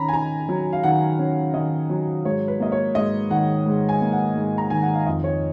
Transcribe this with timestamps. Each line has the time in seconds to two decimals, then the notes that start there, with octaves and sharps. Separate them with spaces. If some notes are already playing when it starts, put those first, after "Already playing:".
Already playing: D#3 C#4 A#5 B5
0.09 G#5
0.13 D#3 A#5
0.49 F#3
0.73 F5
0.83 D#3 F#5
1.19 C#4
1.54 D#3 D#5
1.90 F#3
2.25 G#2 C#5
2.48 B4
2.60 A#3 D#5
2.72 C#5
2.95 G#2 D#5
3.30 D#3 F#5
3.66 G#2
3.89 G#5
4.01 A#3
4.12 F#5
4.36 G#2
4.58 A#5
4.70 D#3 G#5
4.82 F#5
4.95 F5
5.06 F2 D#5
5.24 C#5